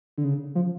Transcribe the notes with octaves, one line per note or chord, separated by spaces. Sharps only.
D3
C#3
F3